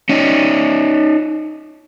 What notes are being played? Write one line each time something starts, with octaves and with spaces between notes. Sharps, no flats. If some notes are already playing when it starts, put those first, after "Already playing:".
C#4 D#4